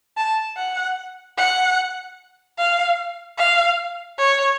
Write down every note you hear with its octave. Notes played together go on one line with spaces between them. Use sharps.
A5
F#5
F#5
F5
F5
C#5